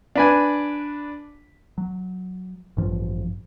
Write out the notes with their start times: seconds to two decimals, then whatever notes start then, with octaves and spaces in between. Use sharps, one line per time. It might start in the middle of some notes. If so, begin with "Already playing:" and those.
0.15 D4 B4 G#5
1.78 F#3
2.77 A1 G2 F3